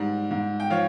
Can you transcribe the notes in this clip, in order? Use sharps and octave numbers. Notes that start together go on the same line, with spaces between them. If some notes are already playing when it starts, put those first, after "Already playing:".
Already playing: G#2 D#3 G3
G#2
G5
F3 C#5 F5